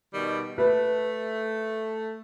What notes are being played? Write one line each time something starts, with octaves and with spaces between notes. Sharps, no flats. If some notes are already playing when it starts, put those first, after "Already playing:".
B2 D#3 G3
A3 B4